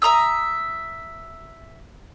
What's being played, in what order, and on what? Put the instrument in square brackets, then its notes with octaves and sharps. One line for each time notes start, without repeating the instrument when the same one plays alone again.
[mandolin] E5 A#5 D#6 E6